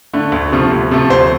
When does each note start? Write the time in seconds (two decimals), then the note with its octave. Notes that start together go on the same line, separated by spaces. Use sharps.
0.13 D3 A3
0.32 D2
0.52 C3 F3 A3
0.71 D2
0.91 C3 F3 A3
1.10 D2 C5